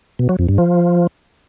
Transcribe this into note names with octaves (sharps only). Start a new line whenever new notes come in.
B2
F#3
F2
G2
F3